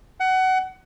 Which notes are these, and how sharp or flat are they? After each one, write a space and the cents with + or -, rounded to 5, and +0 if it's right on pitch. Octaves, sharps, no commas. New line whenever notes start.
F#5 +20